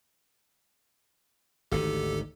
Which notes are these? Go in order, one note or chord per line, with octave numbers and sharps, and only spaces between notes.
G#1 D2 D#3 G4 A4